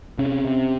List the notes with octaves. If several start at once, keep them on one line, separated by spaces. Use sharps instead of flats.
C3 C#4
C3